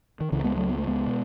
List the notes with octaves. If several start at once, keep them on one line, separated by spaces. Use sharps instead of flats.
D#3
C#2 C#3 E3
G#3 B3
F#3 A3
B3
A3
G#3 B3
B2